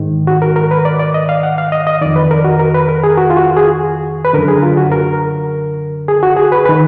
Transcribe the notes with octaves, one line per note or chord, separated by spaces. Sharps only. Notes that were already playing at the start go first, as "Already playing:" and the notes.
Already playing: G#2 D#3
F#4
A#4
A#4
B4
D5
D5
D#5
F5
F#5
F5
D#5
D#5
F2 D#3 D5
B4
A#4
F#4
A#4
B4
A#4
G#4
F#4
F4
F#4
G#4
B4
F#2 D3 A#4
G#4
F4
F#4
A#4
G#4
F#4
G#4
B4
D#3 B4